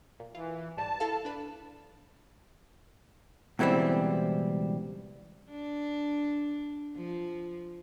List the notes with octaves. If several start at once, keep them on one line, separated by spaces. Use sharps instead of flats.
A#2
E3 F4
G#1 G3 A5
E4 A4 F5
D4 B4
C#2 B2 E3 G3 C4
D4
F3